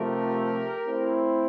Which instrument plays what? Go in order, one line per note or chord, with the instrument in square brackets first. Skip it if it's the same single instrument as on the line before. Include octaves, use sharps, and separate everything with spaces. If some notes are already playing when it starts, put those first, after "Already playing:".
Already playing: [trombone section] C3 F3 A3 [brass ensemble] G4 A#4
[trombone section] A3 C4 E4